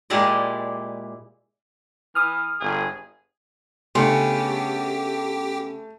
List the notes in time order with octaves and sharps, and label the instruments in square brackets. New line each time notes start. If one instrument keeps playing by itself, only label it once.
[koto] A#2 G#3 E4 G4 D5 D#5
[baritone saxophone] E3 [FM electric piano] D#6 F6
[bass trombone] G1 [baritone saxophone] G#4
[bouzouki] C#3 B3 [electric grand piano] A3 [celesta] D4 C6 [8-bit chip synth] G4